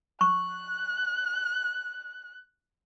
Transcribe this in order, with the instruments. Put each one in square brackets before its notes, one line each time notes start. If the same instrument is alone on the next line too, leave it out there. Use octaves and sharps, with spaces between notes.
[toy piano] C#6 [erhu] F#6